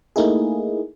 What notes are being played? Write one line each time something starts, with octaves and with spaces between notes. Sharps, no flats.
A3 A#3 D#4 E4 G#4